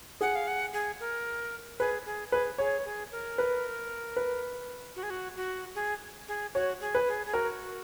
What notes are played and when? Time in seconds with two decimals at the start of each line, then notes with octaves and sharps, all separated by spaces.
0.21 G#4 F#5
0.35 F5
0.48 F#5
0.73 G#4
1.00 A#4
1.79 G#4 B4
2.06 G#4
2.32 G#4 B4
2.58 G#4 C#5
2.85 G#4
3.12 A#4
3.38 B4
4.16 B4
4.96 F#4
5.03 G#4
5.10 F#4
5.36 F#4
5.75 G#4
6.28 G#4
6.55 F#4 C#5
6.81 G#4
6.95 B4
7.08 G#4
7.26 G#4
7.33 F#4 A#4